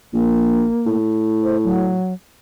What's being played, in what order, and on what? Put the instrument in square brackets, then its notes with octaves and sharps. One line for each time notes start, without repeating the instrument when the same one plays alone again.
[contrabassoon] A#1 [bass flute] A#3
[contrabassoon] A2
[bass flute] C5
F#3